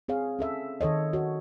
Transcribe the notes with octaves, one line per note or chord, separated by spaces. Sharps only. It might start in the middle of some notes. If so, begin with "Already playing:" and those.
C4 G#4 C#5 F5
C#4 A4 E5
D#3 A4 C#5 D#5
F#4 C#5